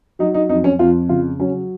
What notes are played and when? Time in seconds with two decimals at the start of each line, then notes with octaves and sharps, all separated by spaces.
0.19 F#3 D#4
0.34 D#4
0.49 F2 D#4
0.64 C#4
0.79 F2 F4
1.09 C#3 F4
1.39 F#3 C#4